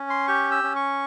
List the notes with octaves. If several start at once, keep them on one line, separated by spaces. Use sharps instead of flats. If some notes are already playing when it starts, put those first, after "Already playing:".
Already playing: C#4
C6
G4 C#6
E6
C#4
C#6